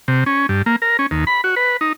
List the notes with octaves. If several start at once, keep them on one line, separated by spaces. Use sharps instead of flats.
C3
C#4
G2
A#3
A#4
C#4
D#2
B5
F#4
B4
D#4